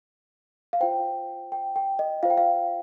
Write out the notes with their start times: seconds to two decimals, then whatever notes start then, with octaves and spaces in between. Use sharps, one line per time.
0.73 F5
0.81 F4 C5 G5
1.52 G5
1.76 G5
1.99 D#5
2.23 F4 C5 F5
2.30 G5
2.37 F5